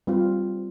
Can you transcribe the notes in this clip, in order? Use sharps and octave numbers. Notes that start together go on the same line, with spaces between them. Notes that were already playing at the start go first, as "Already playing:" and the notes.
G3 C4 F4